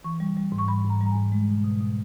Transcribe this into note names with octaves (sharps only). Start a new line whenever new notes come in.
E3 C#6
G3
G3
G#2
C#6
G3 B5
G#2 A#5
G3
A#5
G#2 G#5
G#3
B2
B2
B2